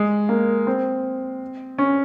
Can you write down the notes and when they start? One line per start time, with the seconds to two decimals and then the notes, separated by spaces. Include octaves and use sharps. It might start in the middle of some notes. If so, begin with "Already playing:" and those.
Already playing: G#3
0.29 A#3
0.67 C4
1.78 C#4